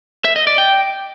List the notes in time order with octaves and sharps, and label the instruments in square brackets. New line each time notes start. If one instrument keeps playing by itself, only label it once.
[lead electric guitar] E5
D#5
D5
G5